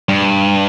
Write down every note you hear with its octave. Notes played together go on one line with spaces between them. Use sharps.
G2